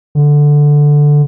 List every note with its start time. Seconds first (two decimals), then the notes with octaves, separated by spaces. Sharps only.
0.15 D3